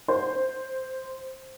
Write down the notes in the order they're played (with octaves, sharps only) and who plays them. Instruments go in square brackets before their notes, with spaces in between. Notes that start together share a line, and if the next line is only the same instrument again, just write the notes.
[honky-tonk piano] C5